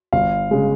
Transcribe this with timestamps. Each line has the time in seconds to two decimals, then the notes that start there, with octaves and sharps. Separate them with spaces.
0.13 G1 F5
0.51 C#3 G#3